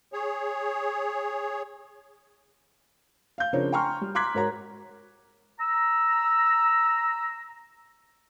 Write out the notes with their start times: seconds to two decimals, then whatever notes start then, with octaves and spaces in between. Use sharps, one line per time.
0.13 G#4 C#5
3.38 F5 G6
3.53 C#3 F3 C4 D4 A#4 C#5
3.72 G5 G#5 A#5 C6 C#6 F6
4.01 G3
4.15 A#5 C6 D6 F#6 G#6 B6
4.34 G#2 F#4 A#4 C#5 A#5
5.60 A#5 E6